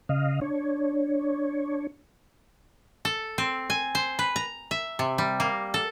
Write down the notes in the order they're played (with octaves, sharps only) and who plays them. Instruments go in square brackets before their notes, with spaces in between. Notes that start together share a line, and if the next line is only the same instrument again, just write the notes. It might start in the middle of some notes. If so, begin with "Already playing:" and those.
[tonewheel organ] C#3 D#5 F5
D4 C#5
[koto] A4
C4
G#5
C5
B4
A#5
E5
C3
G3
A#3
A4